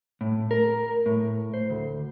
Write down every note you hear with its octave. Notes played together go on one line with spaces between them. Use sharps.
A2
A#4
A2
C5
D2